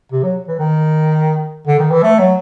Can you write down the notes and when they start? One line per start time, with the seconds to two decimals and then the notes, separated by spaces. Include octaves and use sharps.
0.12 C3
0.23 F#3
0.48 E3
0.59 D#3
1.67 D3
1.79 D#3
1.91 E3
2.03 A3
2.19 F#3